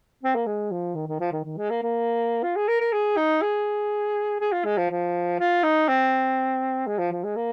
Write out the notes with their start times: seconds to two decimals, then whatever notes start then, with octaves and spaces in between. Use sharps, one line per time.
0.23 C4
0.35 A#3
0.46 G#3
0.71 F3
0.95 D#3
1.08 D#3
1.20 F3
1.32 D#3
1.44 D#3
1.57 G#3
1.70 A#3
1.82 A#3
2.43 F4
2.56 G#4
2.68 A#4
2.81 A#4
2.93 G#4
3.17 D#4
3.42 G#4
4.40 G#4
4.52 F4
4.64 G#3
4.77 F3
4.90 F3
5.40 F4
5.64 D#4
5.88 C4
6.87 G#3
6.99 F3
7.12 F3
7.24 G#3
7.36 A#3